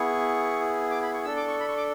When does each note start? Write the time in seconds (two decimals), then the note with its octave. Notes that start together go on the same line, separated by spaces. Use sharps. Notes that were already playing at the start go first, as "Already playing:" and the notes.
Already playing: B3 E4 G#4 C#6
0.91 D6
1.02 B5
1.14 C#6
1.25 D4 A4 E6
1.37 D6
1.48 C#6
1.60 B5
1.68 C#6
1.77 D6